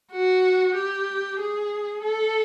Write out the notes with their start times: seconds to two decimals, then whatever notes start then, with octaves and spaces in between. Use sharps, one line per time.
0.12 F#4
0.75 G4
1.39 G#4
2.03 A4